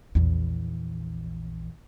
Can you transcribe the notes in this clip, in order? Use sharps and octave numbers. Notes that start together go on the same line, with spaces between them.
A#1 E2